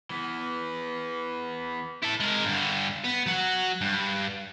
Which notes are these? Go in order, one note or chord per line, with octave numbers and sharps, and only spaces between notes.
E3 B3
E4 A4
G#3 A#4
G2 D3
B3
F#3 F#5
G2